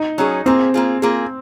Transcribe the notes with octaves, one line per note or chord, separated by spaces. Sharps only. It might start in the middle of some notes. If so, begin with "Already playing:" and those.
Already playing: D#4
F#3 C#4 G#4
A#3 C4 F4 G#4
A#3 F4 G#4
A#3 F4 G#4